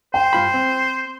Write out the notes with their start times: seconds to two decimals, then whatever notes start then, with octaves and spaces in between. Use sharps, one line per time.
0.14 C5 G5
0.33 G2 F4 B5
0.54 C4